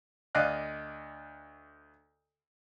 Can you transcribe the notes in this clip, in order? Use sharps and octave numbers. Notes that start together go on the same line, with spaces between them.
D2 D5 D#5 F5 F#6